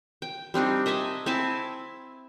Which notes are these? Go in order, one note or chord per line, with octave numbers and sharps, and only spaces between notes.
G5
G3 C4 D4 D#4
D#5 E5 G#5 A5
C4 E4 G#5 A5